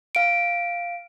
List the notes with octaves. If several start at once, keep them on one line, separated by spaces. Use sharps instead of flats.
F5 D7